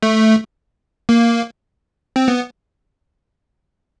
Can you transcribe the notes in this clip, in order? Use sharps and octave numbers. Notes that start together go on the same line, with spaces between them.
A3
A#3
C4
B3